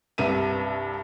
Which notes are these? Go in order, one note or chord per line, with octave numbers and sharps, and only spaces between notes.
C2 G2 E5 D#7